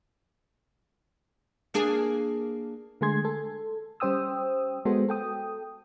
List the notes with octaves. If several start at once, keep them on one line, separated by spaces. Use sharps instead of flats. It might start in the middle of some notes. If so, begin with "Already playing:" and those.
A#3 D4 G#4
D3 G#3 A3 G#4 C6 G#6
A4
G3 C#4 C5 G5 D#6 E6
G#3 B3 F#4 A4 C5
A4 G5 D#6